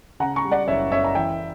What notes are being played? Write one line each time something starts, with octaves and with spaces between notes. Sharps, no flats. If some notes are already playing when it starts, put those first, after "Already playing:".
C#3 F#5 A#5
A#5 C#6
G3
D5 F#5
F#1 C#5 E5
F#2 C#5 E5
A#5
E3 E5 G5